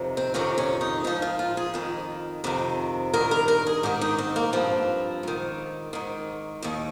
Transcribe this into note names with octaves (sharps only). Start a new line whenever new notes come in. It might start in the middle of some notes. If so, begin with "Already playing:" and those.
Already playing: F2 C3 D#3
C4
F2 C3 D#3 C#4
C#4
D#4
G#2 F3 D#4
F4
F4
G#4
F2 D#3
F2 C3 D#3
G2 D#3 A#4
A#4
A#4
G#4
G#2 D#3 G4
D#4
C4
A#3
G2 F3 C4
G#2 D#3
G#2 D#3
D#2 D#3